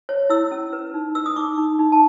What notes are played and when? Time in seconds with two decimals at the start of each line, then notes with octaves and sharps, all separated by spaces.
0.09 C#5
0.30 E4 E6
0.51 C#4
0.73 B4
0.94 D#4
1.15 B4 E6
1.26 D#6
1.36 D#4 D6
1.58 D#4
1.79 D#4
1.92 A5